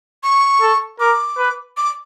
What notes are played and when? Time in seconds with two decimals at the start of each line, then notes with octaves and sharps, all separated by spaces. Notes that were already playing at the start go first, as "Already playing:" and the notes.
0.23 C#6
0.61 A4
1.00 A#4 D6
1.38 B4
1.77 D6